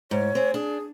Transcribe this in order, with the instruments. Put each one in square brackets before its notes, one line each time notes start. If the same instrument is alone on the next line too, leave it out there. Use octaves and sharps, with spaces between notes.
[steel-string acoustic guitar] G#2 [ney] C#5
[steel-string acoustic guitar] C4 G#4
[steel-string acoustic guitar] D4 [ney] G#4